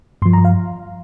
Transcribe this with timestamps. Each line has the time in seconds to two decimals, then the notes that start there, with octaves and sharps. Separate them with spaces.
0.22 G2 C6
0.26 F3
0.33 A#5
0.45 F5